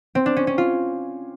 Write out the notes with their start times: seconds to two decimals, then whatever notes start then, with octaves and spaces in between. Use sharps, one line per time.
0.15 C4
0.26 D4
0.37 C#4
0.47 C#4
0.58 F4